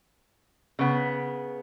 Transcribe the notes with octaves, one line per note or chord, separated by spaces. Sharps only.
C#3 B3